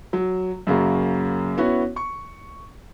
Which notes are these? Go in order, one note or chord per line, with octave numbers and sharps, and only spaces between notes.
F#3
F#2 C#3 A#3 F#4
B3 C#4 E4 F#4
C#6